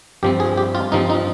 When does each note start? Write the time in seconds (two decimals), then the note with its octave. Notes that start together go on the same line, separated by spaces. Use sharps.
0.23 G2 F3 C4 G4
0.40 G#4
0.58 G4
0.75 F4
0.92 G2 F3 C4 D#4
1.10 D#4